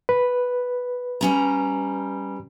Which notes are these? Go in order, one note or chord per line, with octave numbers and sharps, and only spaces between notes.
B4
G3 C#4 A#5